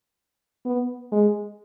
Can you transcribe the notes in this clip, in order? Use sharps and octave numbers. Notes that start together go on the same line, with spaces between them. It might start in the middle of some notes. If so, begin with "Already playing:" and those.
B3
G#3